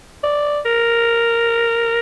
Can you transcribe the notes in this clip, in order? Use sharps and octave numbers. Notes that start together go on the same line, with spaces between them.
D5
A#4